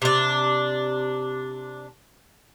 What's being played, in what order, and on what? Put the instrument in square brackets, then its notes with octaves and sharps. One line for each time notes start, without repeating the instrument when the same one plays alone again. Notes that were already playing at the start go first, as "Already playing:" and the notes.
[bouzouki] C3 D4